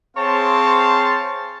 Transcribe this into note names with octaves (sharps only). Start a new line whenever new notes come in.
C4 G#4 C5 C#5 F5 A5